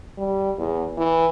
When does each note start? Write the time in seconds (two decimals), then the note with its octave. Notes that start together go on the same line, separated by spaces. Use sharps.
0.18 G3
0.58 E2
0.98 E3